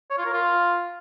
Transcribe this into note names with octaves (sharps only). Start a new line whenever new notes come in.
C#5
F4
A#4
F4